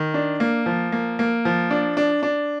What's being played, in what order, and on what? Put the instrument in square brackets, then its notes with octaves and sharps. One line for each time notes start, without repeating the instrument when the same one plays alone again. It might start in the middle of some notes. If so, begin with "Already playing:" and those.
Already playing: [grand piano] D#3
D4
A#3
F3
A#3
A#3
F3
D4
D4
D4